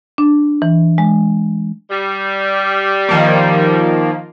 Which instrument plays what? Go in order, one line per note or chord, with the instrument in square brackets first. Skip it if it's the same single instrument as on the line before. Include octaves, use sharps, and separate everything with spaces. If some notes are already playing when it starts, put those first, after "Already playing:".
[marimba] D4
E3
G#3
[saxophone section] G3
[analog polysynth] D#3 F3 A#3